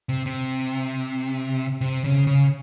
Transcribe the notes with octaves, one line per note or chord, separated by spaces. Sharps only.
C3
C3
C3
C#3
C#3